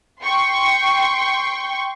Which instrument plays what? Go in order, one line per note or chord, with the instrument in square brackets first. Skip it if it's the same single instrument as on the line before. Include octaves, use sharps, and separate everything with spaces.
[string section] G5 C6 C#6